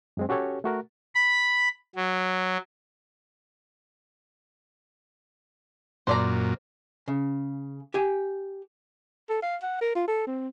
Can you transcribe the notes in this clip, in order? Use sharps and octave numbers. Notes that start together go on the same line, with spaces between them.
F#2 G#3 C4
C#4 F#4 G4 A4 C#5
A3 F#4 A#4
B5
F#3
F#2 A#2 C5 D5 A#5
C#3
G4 G#5
A4
F5
F#5
A#4
F4
A4
C4